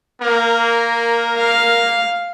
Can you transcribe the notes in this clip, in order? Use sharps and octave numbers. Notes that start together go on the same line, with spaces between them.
A#3 A#4
F5